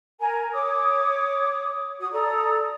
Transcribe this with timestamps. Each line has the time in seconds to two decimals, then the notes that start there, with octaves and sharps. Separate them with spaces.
0.21 A#4 G#5 A#5
0.52 C#5 D6 D#6
2.00 F#4 D#6
2.12 A4 D5 A#5 D#6